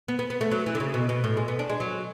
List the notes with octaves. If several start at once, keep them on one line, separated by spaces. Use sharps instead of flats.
B3
B3
B3
A3
F#3
E3
D3
C#3
B2
B2
A2
G#3
B3
D4
G#3
F#3